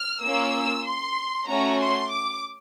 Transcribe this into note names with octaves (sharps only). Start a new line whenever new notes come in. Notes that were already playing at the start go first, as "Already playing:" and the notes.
Already playing: F6
A#3 C#4 F4 E6
C6
A3 C#4 F#4 A#5
C6
D6